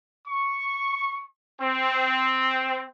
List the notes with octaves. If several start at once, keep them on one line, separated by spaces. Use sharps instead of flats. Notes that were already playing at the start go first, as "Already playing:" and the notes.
C#6
C4